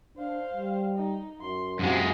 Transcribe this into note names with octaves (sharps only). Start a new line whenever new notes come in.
D4 C5 F5
G3
D#4
F#2 C6
F#2 C3 G#3 F4 F#4